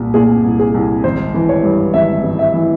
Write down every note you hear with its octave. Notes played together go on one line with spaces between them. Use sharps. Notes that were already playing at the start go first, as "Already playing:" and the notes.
Already playing: C2 A#2
A#2 G#4
C2
G#4
C2
G#1 C5
E3
C#5
G2
G#1 E5
G#1
E5
E3